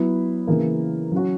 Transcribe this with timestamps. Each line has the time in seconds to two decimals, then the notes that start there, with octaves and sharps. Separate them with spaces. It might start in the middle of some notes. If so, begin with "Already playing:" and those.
Already playing: F#3 B3 E4
0.47 C#3 E3 A#3
1.12 F#3 C#4 F#4